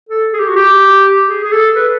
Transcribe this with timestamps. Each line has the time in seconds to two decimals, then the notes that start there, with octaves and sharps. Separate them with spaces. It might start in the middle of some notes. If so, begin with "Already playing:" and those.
0.09 A4
0.33 G#4
0.39 G4
0.48 F#4
0.56 G4
1.28 G#4
1.44 G#4
1.52 A4
1.76 B4